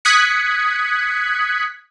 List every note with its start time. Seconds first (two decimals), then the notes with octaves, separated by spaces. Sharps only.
0.05 D#6 F#6 G#6 B6 C#7